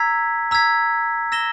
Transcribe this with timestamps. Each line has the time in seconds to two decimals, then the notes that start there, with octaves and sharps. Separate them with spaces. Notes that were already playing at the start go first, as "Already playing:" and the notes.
Already playing: A#5 E6 G#6 B6
0.51 A#5 E6 G#6 B6
1.32 E6 A#6 E7 G7